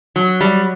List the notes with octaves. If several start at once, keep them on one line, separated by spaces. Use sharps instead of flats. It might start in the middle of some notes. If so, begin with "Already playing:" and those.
F#3
G3